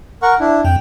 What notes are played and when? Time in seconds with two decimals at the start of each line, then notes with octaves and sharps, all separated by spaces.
0.22 A#4 F#5 C#6
0.40 D4 E4
0.65 F2 G5